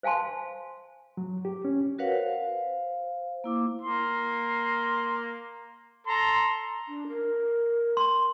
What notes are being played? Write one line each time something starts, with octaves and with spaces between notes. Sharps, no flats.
C5 F5 G#5 A5 C6
F#3
G4
C#4
F#4 A#4 B4 C#5 F5 F#5
C5 F5
A#3 E4 D6
A#3 C6
A4 A#5 C6
D4
A#4
C6